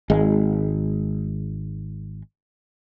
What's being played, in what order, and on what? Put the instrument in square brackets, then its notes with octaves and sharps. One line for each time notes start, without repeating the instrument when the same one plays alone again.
[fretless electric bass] G#1 G#3